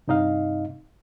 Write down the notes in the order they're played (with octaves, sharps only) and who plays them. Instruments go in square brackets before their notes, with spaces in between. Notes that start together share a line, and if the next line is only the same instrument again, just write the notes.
[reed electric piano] G2 C3 D#4 D#5 F5